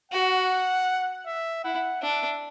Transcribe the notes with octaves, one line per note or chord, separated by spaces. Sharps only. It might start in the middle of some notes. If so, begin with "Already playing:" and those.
F#4 F#5
E5
E4 F#5
D4 E5